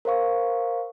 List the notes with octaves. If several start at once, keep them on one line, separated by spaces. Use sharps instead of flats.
A#4 C5 F5 C#6